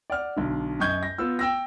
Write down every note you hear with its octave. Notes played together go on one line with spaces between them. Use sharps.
D5 F#5 F6
B1 D3
F#2 D#5 C#6 G6 G#6
A#6
B3 F4 E6
G5 E6 A#6